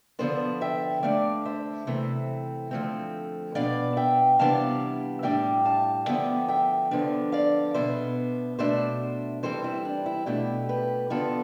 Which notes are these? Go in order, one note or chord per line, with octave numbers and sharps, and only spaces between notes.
D3 F3 B3 D4 A4 C5
E5 G5
D3 A3 D4 D5 F5
C5 E5
C3 E3 A3 C4
D3 F3 A3 C4
B2 B3 D4 D5 F5
E5 G5
C3 E3 G3 B3 D4 F5 A5
A2 G3 D4 E5 G5
F5 A5
D3 F3 B3 D4 E5 G5
E5 G5
D3 F3 B3 D4
D5 F5
B2 B3 D4 C5 E5
B2 A3 D4 C5 E5
E3 G3 C4 A4 C5
E4
D4
E4
B2 A3 D4 E4 G4
G4 B4
D3 F3 B3 D4 F4 A4